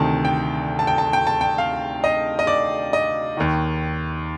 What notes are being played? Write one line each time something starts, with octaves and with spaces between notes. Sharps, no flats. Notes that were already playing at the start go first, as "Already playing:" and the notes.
Already playing: D2 C3 D#3 A5
G5
A5
G5
A5
G5
A5
G5
F5
D#5
D#5
D5
D#5
D#2 D#3